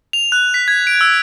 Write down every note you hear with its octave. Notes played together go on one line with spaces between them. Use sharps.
F7
F#6
B6
G#6
D7
E6